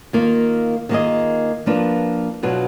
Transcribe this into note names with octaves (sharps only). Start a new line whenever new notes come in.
D#3 A#3 F4
D#3 A#3 F4 G#4 D#5
F3 A#3 D4 F4 B4
B2 F#3 D4 F4 B4